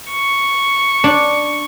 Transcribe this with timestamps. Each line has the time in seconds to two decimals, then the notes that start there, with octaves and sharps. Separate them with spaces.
0.11 C#6
1.04 D4